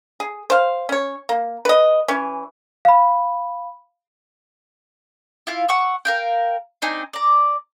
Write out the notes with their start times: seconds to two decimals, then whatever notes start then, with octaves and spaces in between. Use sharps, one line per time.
0.20 G#4
0.50 C5 F5
0.89 C#4 C#5
1.29 A#3
1.65 B4 D#5
2.08 E3 C#4
2.85 F5 B5
5.47 E4 F4 F5
5.68 F#5 C#6 E6
6.05 A#4 F5 G5
6.82 C4 D4 D#4 G#5
7.13 D5 A#5